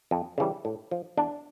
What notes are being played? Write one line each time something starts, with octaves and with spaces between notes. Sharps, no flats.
F2
C#3 E3 G3
A2
F3
E2 D4